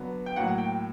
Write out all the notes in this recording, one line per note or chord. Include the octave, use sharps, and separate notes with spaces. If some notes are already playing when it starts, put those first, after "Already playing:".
Already playing: D3 F#3 B3
G5
A2 F#3 A#3 F#5
G5